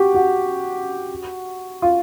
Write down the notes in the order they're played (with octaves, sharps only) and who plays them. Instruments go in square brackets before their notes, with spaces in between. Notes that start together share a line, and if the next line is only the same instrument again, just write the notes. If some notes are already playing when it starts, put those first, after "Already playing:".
Already playing: [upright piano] F#4 G4
F#4
F4